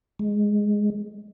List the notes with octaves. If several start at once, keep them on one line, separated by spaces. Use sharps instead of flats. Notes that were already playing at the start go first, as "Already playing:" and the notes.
G#3